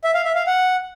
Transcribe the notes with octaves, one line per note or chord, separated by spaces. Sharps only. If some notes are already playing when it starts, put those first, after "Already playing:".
E5
F5
E5
F5
F#5